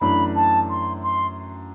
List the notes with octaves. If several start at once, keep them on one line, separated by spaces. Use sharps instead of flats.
F#2 E3 A3 D4 B5
A5
C6
C6